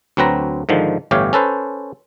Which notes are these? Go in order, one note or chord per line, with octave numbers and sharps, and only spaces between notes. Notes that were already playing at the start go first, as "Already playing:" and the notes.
D2 F#3 C4 B4 A#5
G#2 D3 D#3 F3
G1 A2 E3 G4 C#5 F5
C#4 A4 B4 C5